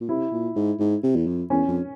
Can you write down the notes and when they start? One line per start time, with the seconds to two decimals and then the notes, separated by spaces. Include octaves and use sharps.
0.01 A#2
0.09 C3 E4
0.32 A#2
0.56 G#2
0.79 G#2
1.03 C3
1.16 E2
1.26 F2
1.50 E2 C#4
1.68 F2